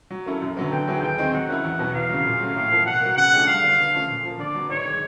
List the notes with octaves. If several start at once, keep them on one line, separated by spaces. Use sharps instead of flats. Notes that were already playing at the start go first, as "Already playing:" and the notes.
F#3
A#3 C#4 E4 A4
F#2
D3 F#3 B3
D3 G5
F#3 B3 E4 G#4
D#2 G5
D#3 G#3 C4
F#3 F#5
A#3 C#4 E4
E2
B2 F#3 B3
E2 F5
C#3 F#3
A#2
F#3 A3 C#4
A2
F3 A#3
B2 F#5
F#3 A#3
C#3 F#5
F3 A3 D4 G4
G2 F5
D3 F#3 B3 D4
D3
F3 A3 C#4
A#2
F3 A#3
D3 D5
F#3 B3
G#2 C#5
D#3 G#3